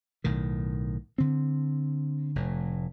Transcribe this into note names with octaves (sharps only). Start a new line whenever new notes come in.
B1 A2 D#3
D3 C4
F1 A2